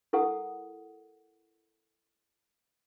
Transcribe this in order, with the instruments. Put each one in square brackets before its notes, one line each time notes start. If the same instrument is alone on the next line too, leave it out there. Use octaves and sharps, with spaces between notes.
[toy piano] E4 A4 A#4 F#5 D#6